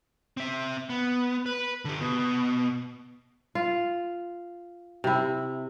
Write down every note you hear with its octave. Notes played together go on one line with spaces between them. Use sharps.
C4 E5
B3
B4
D3 G4
B2
F4
C3 E4